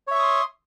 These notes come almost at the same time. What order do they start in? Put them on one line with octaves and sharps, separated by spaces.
C#5 E5 C#6 D#6 C6